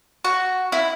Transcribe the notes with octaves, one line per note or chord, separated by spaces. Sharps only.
F#4
E4